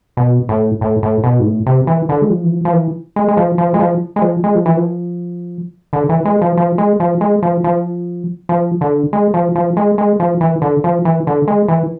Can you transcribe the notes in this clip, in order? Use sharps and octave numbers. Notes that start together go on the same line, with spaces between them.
B2
A2
A2
A2
B2
G#2
A2
C3
E3
D3
G#3
F3
E3
F3
F3
E3
G#3
G#3
F3
F3
G#3
F3
G#3
F3
G#3
F3
E3
F3
D3
E3
G#3
F3
F3
G#3
F3
G#3
F3
F3
F3
D3
G#3
F3
F3
G#3
G#3
F3
E3
D3
F3
E3
D3
G#3
E3